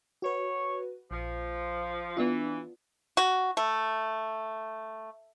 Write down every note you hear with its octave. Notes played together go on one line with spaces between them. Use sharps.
F#4 B4 C#5
A#1 F3
E3 B3 D4 F4
F#4
A3